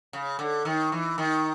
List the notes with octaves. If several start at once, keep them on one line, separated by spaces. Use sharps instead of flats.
C#3
D3
D#3
E3
D#3